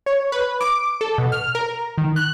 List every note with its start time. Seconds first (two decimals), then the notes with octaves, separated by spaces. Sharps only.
0.06 C#5
0.32 B4
0.61 D6
1.01 A4
1.18 B2
1.32 F6
1.55 A#4
1.98 D#3
2.16 F#6